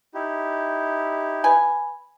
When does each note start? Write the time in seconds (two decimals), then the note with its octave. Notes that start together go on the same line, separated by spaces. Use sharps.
0.14 D#4 E4 G4
1.44 B4 G#5